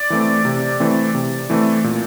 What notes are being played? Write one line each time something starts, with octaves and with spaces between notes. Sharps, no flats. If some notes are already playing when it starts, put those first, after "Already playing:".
Already playing: D5
E3 A3 C4
C3
E3 A3 C4
C3
E3 A3 C4
A#2